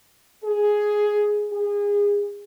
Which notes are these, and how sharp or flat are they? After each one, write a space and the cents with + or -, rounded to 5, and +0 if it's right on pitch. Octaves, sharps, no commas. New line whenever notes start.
G#4 +5
G#4 -25